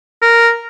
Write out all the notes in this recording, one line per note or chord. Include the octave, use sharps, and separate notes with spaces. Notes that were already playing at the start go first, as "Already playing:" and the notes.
A#4